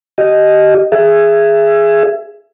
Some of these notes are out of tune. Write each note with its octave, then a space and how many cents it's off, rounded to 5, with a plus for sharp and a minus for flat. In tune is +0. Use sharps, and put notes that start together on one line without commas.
G4 -25 D#5 +0
G#4 +0 E5 +25